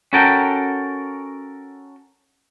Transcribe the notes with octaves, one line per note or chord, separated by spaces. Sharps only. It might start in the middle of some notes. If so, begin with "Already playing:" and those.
C#4 F#4 A4 A#4 G5